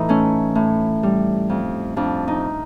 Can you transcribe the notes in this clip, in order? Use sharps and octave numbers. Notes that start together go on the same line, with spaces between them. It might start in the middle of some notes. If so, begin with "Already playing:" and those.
Already playing: A2 E3 D#4
A3 C#4
A2
G3
F2
F2 D4
D#4